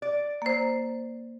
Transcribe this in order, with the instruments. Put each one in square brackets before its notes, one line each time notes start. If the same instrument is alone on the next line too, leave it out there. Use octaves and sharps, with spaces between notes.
[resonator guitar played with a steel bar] D5
[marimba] A#3 C5